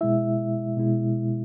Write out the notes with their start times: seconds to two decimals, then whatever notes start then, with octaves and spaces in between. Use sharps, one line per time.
0.01 B2 G#3 E4 E5
0.77 B2 G#3 E4